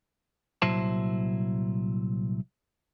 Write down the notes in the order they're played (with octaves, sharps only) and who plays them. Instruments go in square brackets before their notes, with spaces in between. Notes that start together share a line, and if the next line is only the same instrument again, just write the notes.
[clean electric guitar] C2 A#2 F#3 E4 C5 A5